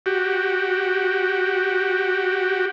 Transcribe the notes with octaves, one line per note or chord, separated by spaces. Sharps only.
F#4 G4